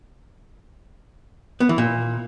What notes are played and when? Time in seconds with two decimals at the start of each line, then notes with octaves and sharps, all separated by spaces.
1.60 B3
1.69 E3
1.78 A#2